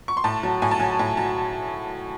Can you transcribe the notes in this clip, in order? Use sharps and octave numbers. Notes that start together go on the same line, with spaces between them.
C#6
C6
A2 A5
F#3
A2 G#5
A5
F#3 G#5
A2 A5
F#3 A5